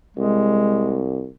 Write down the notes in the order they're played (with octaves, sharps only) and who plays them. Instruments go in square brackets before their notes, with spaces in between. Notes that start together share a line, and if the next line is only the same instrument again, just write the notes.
[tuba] C2 [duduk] G#3